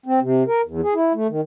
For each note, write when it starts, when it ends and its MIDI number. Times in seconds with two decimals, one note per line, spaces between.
0.06 0.20 60
0.21 0.43 48
0.47 0.61 70
0.65 0.81 40
0.83 0.94 68
0.95 1.13 64
1.14 1.27 57
1.29 1.41 51